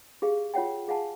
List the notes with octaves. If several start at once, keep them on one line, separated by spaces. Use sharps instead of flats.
G4 G#4 F5
F4 C#5 F#5 G5
G#4 F5 F#5 G#5 A5